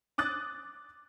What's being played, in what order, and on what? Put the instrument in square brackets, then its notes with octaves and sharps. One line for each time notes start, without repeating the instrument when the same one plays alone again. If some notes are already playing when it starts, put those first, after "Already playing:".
[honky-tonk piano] D6 D#6 F#6 A6